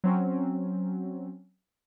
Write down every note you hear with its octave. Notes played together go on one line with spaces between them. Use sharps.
F#3 C4 C#4